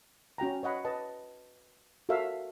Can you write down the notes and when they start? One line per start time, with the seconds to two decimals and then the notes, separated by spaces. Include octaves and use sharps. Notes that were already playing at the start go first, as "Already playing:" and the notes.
0.38 C#4 F#4 G5 A#5
0.63 C#5 D#5 F#5 B5
0.85 B4 D#5 A5
2.09 F#4 A4 A#4 C#5 E5 F5